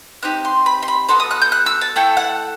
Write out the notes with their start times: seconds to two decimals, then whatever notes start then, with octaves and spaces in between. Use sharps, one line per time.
0.23 C4 D#4 G4 F#6
0.45 C6
0.66 B5
0.82 C6
0.88 B5
1.09 B3 F#4 A4 C6
1.20 D#6
1.31 F#6
1.41 G6
1.52 F#6
1.66 E6
1.81 A5
1.96 A3 E4 A4 G5
2.17 F#5